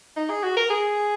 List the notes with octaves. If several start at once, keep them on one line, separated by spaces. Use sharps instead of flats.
D#4
G#4
F#4
A#4
G#4